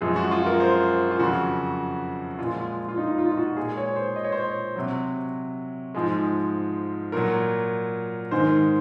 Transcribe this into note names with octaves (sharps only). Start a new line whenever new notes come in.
F#2 F3 G#3 G#4
F#4
F4
A#4
C5
F4
F2 C#3 F#3 F#4
A#2 F3 G#3 F4
F4
D#4
F4
F4
F#4
A#2 G#3 G#4
C#5
C5
D#5
C#5
C5
C#5
C3 F#3
G#2 F3 G#3
A#2 F#3 A#4
G#2 D#3 G#3 C5